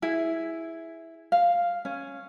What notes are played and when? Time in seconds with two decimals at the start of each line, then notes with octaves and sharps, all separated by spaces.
0.02 E4 G#4
1.32 F5
1.85 C#4